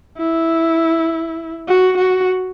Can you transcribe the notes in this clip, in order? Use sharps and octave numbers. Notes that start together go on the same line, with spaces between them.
E4
F#4
F#4